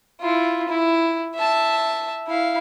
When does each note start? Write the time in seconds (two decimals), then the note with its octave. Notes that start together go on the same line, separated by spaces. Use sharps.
0.21 E4 F4
0.68 E4
1.36 E5 A5
2.27 E4 F5